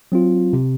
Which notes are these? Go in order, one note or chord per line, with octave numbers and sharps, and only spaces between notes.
F#3 C4 F4
C3